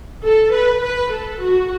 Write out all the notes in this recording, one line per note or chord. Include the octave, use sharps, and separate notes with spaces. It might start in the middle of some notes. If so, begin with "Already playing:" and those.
A4
B4
B4
A4
F#4